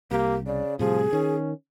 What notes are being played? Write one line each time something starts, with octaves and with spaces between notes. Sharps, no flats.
C2 A#3 G4
C#3 D5
A2 C3 F3 G3 G#4
D#3 C#4